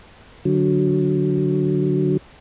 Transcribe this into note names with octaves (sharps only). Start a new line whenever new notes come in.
D3 F#3